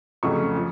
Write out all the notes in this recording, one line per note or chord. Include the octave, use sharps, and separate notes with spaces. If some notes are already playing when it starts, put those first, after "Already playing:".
F2 C#3 F#3 A3 C#6
F3